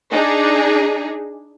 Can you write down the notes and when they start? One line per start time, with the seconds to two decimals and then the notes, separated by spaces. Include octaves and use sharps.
0.12 D4 D#4 G#4